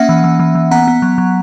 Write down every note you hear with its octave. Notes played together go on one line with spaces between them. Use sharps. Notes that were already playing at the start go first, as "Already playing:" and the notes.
Already playing: A#3 C#4 E5 F#5
E3
E3
E3
E3
B3 F#5 A#5
B3
F#3
F#3